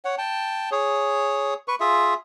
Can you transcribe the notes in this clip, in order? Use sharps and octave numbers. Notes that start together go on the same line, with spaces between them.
C#5 F#5
G5 A5
G#4 C#5
B4 C#6
F4 G#4 E5